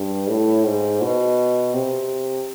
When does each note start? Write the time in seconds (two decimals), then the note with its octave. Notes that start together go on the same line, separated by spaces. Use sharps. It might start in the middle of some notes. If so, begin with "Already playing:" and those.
Already playing: G2
0.29 A2
0.66 G#2
1.02 B2
1.74 C3